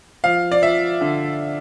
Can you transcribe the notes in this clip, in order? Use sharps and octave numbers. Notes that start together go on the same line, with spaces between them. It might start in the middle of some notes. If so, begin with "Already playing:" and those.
F3 F5
D5
F3 E5
D3